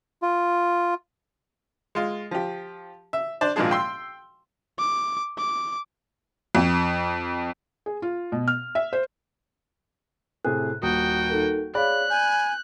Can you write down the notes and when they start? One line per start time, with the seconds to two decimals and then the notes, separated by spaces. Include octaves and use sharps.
0.22 F4
1.95 G#3 F4
2.31 F3 G4
3.13 E5
3.41 D4 C5 D5
3.56 G#1 A#2 F3 G#3 D4 G#4
3.71 G5 C6 E6
4.78 D6
5.38 D6
6.55 F2
7.86 G#4
8.02 F4
8.32 B2
8.48 F6
8.75 E5
8.93 C5
10.45 A2 C3 G#4 F#6
10.82 D#1 F#4 G5 D#6
11.30 D#4 A4 A#4
11.75 G#4 C#5 D5 F5 B5 F#6
12.10 G#5 G6